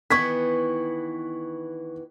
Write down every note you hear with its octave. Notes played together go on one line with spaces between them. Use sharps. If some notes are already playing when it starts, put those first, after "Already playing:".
D#3 E3 B3 C#6 G#6 B6